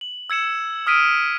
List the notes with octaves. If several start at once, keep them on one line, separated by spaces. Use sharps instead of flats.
F#7
E6 G#6 C#7 E7
D#6 F6 B6 D7 D#7